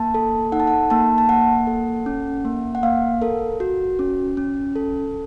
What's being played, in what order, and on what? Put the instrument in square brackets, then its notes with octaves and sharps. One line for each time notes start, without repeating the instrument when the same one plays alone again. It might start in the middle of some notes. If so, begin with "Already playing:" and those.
Already playing: [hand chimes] A#3 A5
A4
D#4 F#5
A5
F#5
A#3 A5
A5
A#3 F#5
A4
C#4
A#3
F#5
A#3 F5
A4 A#4
F#4
C#4
C#4
A4